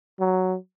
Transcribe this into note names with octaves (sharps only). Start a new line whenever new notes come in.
F#3